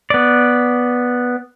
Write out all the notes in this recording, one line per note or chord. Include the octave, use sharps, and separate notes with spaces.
B3 D5